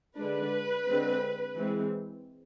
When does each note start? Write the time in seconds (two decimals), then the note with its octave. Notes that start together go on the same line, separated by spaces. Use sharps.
0.17 D3 G#3 D4 B4
0.87 D3 G#3 C4
1.57 E3 G#3 C4